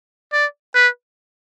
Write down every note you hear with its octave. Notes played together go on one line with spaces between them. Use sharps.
D5
B4